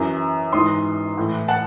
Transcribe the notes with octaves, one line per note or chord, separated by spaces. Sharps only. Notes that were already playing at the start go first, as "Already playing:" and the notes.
Already playing: F#2 E3
G#2 E3 C6 D#6
A2 E3
F#5 A5